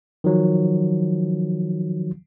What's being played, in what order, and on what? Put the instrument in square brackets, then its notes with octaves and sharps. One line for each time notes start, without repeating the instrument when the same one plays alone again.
[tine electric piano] D#3 F3 F#3